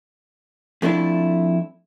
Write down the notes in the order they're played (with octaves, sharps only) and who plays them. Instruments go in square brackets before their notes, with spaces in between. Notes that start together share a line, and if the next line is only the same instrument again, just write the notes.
[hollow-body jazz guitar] F2 A3 D4 E4